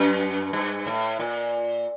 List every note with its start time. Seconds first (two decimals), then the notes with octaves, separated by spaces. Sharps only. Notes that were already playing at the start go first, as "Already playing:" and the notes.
Already playing: F#2
0.53 G2
0.87 A2
1.19 A#2